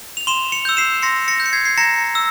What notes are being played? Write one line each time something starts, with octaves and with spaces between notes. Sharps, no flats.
F7
C6 E7 G7
C#7 F7
E6 G6
C7 E7
C6 A#6 C#7
A#6 C#7
G6
C#7
G#6 C7
C7
A#5 A#6 C#7
E6